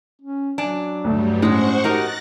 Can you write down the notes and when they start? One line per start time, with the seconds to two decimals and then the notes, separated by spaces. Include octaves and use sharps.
0.22 C#4
0.58 F#3 D4 G#5
1.04 D2 G2 G3 A3
1.42 A2 F#3 G#3 C#4 C5 F#5 C#6
1.84 D#4 F#4 G4 A#4 F#6 A6 A#6